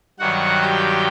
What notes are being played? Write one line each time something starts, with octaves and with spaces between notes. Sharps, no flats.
G2 D#3 F#3 F#4 F#5
G4 G5